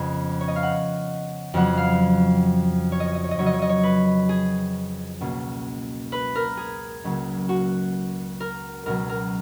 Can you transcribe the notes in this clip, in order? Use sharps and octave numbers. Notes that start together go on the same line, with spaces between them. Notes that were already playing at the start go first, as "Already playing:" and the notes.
Already playing: F2 C#3 G#3 B3 G#5
C#5
D#5
F5
F#5
F2 C#3 F#3 B3 F#5
F5
C#5
D#5
C#5
D#5
C#5
D#5
F2 C#3 F#3 C#4 C#5
D#5
C#5
D#5
C#5
B4
G#4
C#2 B2 A#3 C#4
B4
A#4
G#4
C#2 C#3 F#3 A#3
F#4
A#4
C#2 B2 F#3 A#4
A#4